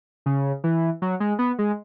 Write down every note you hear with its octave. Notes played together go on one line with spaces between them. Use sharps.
C#3
E3
F#3
G#3
B3
G#3